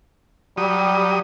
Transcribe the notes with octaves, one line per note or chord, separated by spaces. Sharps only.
F#3 G3 G4 D#6